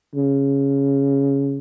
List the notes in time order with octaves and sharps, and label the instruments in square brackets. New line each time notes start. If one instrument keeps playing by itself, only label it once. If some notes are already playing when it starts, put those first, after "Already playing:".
[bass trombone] C#3